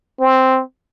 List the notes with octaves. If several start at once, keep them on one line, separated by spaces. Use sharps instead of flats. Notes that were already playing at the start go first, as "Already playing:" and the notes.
C4